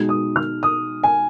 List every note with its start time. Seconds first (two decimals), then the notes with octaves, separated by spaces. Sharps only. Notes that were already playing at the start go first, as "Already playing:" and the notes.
Already playing: B2 G#3 D#4
0.09 D#6
0.36 F6
0.63 D#6
1.03 G#5